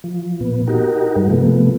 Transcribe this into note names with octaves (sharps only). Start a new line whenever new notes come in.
F3
A#2 B3
D#4 F#4 G4 A#4
G2 G3 G#3
C3 F3 A3 B3